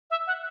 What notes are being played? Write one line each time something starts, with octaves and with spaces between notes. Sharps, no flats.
E5
F#5